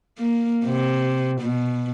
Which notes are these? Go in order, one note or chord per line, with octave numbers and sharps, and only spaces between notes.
A#3
C3
B2